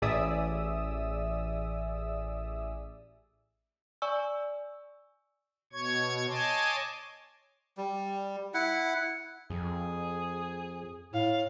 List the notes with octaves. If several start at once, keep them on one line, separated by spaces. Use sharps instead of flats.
A1 G#4 D5 E5 D#6 E6
D5 G#5 C#6 E6
B2 C#5 C#6 G#6
C#5 D#5 G#5 A5 C6 D6
G3
E4 F#5
F2 G#4
A2 F5